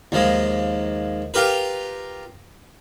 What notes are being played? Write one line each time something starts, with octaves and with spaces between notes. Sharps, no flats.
D#2 F3 G#3
F4 G4 A#4 B4